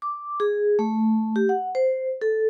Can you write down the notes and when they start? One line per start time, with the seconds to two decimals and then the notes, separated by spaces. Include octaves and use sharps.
0.02 D6
0.40 G#4
0.79 A3
1.36 G4
1.49 F#5
1.75 C5
2.21 A4